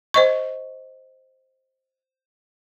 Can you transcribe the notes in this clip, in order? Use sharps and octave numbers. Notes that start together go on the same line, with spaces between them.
C5 D#5 C#6